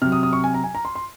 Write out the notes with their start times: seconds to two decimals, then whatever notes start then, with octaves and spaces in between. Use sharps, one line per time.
0.02 C3 F#3 F6
0.12 D#6
0.23 D#6
0.33 C#6
0.44 G#5
0.54 A#5
0.64 G#5
0.75 A#5
0.85 C6
0.95 C6